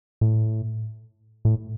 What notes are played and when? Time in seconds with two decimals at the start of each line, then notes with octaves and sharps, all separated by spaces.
0.21 A2
1.45 A2